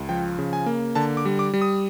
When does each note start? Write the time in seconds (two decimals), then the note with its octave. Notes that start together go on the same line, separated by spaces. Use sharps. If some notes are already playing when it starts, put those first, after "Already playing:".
Already playing: C#2
0.09 F3 G5
0.38 C#3
0.53 G#5
0.66 A#3
0.95 D3 A5
1.17 D6
1.25 G3
1.39 D6
1.54 G3
1.61 D#6